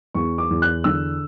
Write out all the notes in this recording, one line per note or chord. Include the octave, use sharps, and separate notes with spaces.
E2 C#6
D6
E2
F#6
D3 E6